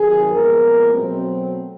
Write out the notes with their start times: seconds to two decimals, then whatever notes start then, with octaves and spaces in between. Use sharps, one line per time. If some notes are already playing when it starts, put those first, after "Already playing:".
Already playing: C3 D#3 F#3 G#4
0.31 A#2 F3 G#3 B3 A#4
0.93 B2 F#3 A3 C4